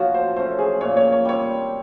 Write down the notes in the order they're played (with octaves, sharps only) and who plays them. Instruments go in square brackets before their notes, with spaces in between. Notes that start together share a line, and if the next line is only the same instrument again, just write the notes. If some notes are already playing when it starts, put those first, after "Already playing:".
Already playing: [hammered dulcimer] F3 A3 C#4 [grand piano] F#4
[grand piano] C5
[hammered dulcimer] A3 C#4 [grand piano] C5
[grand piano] G#4
[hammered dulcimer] A#2 [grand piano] C#5
[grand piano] C#5
C#5
[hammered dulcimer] G3 C4 [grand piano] C#5